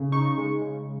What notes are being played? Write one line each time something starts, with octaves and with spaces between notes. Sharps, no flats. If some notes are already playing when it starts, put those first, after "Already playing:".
Already playing: C#3
D#4 C#6
G#3
C#3